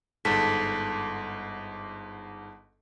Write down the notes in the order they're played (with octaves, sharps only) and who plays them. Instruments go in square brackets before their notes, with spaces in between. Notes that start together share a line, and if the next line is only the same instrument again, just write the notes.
[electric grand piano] G1 G#2 [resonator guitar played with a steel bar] A4 [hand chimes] A5 B6